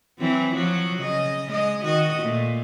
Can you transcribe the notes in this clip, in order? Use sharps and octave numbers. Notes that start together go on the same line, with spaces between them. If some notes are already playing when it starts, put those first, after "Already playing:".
E3 F#3 C4
F3 F#3 F#4
C#3 D#5
G#3 D#5
D#3 F#4 D#5
A#2 A3